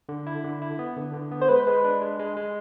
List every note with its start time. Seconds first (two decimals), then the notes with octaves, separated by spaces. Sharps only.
0.09 D3
0.27 E4
0.44 D3
0.62 E4
0.79 B3
0.96 D3
1.14 D3
1.32 B3
1.41 C5
1.49 G#3 B4
1.67 G#3
1.84 D4
2.02 G#3
2.19 G#3
2.37 G#3